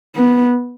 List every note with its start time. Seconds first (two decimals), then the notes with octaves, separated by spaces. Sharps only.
0.16 B3